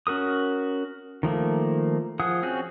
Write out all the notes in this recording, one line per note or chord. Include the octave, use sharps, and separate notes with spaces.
C#4 F#4 A#4 D#6
D#3 F3 A3 A#3
F3 G#4 F#5 D#6
C4 C#4 F#4 G#4